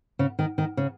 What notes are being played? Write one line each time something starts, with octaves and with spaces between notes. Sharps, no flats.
C#3
D#3
D#3
C#3